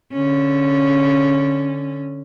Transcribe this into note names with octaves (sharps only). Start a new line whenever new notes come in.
D3 C#4